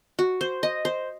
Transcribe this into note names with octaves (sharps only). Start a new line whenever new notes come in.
F#4
C5
D#5
C5